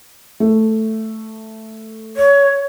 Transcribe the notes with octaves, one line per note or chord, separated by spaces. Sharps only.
A3
C#5